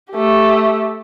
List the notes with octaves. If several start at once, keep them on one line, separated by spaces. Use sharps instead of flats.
A3 G4